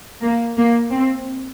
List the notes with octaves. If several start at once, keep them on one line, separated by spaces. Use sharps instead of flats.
A#3
A#3
C4